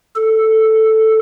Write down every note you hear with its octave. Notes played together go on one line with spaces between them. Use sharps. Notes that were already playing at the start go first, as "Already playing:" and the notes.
A4